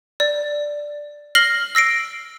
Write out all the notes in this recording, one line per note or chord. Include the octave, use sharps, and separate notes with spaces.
D5
F6 A#6 C7 F#7 G7
E6 A#6 C7 D7